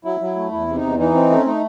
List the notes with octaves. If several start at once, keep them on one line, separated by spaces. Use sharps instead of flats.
F#3 E4
F#3
A3
E2 E4
C3
D#4
E2
E3 D#4
C4
A3
C#4
A3 D#4